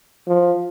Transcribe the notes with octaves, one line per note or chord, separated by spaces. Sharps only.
F3